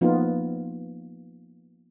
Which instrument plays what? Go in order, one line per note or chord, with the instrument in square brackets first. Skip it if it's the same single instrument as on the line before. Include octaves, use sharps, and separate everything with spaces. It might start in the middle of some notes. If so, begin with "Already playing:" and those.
[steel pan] F3 A#3 B3 D#4 F4